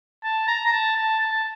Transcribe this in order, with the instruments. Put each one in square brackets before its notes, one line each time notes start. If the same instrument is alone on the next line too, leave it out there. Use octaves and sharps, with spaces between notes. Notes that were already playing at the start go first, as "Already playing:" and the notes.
[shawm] A5
A#5
A#5
A5
A5
A5